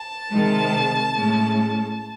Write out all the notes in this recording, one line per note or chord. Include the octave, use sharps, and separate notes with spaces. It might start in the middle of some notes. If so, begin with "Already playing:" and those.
Already playing: A5
C3 D#3 G#3
A2 G#3 C#4